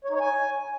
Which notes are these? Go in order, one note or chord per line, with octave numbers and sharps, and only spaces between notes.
C#5
D#4
C#5
G#5